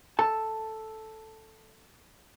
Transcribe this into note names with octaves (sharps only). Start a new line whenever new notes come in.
A4 A5